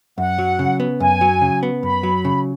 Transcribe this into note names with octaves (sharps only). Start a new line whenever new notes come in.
F#2 F#5
F#3
C#3
B3
F#2 G#5
F#3
C#3
B3
F#2 B5
F#3
C#3